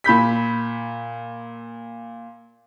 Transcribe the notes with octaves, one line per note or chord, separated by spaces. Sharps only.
A#2 B5 G6 B6